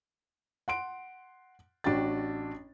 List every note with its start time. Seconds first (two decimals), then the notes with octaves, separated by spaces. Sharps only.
0.68 F#5 C6 D7
1.84 A1 D4 F#4 G5 A6